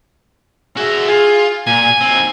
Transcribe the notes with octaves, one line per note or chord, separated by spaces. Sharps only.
F#4 G#4 E5
F4 G#4
A#2 G#5
D#2 C4